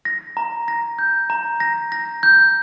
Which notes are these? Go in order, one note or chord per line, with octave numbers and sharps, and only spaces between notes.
A#6
A#5
A#6
G6
A#5
A#6
A#6
G6